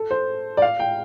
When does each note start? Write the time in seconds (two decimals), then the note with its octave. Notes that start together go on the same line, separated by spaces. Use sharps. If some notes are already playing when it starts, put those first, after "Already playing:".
Already playing: A4
0.11 C5
0.57 D5
0.62 F5
0.79 G5